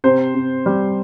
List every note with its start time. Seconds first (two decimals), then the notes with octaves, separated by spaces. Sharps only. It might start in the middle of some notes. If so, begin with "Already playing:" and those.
0.04 C3 C5
0.35 C3
0.66 G3